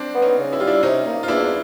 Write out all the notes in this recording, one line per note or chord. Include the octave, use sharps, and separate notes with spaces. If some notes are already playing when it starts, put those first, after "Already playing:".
Already playing: C4 D4
B3
C#4 D#4
C#3
E4
G3 F4
D4 E4
C3 C#4 D#4
A#3
F4
E2 D4 E4